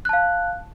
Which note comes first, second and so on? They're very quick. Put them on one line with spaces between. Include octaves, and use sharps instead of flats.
F#6 A5 F5